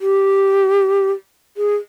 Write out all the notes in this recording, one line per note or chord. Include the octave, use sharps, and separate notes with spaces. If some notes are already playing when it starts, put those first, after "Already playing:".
G4
G#4